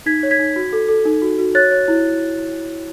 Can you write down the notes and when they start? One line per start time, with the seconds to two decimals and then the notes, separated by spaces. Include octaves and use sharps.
0.06 D#4 G#6 B6
0.23 C#5
0.31 G#6 B6
0.39 D#4
0.56 F#4
0.72 A4
0.88 A4
1.05 D#4
1.22 F#4
1.39 F#4
1.55 C#5 F#6 A6
1.71 C#5
1.88 E4